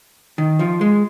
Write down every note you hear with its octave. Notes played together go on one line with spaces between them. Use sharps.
D#3
F3
G#3